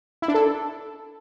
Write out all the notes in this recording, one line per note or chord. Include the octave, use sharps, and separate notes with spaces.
E4
D4
A4